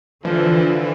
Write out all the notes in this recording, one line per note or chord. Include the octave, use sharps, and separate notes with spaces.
D3 E3 F3